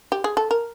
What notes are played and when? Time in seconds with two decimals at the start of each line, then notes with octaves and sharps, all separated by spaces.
0.12 G4
0.24 G#4
0.37 A4
0.51 A#4